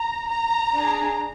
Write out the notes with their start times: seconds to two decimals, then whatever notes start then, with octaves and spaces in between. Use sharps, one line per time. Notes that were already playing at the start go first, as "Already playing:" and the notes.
Already playing: A#5
0.29 A#5
0.74 D4 G#4